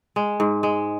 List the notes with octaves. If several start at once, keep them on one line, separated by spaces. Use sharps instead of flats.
G#3
G#2
G#3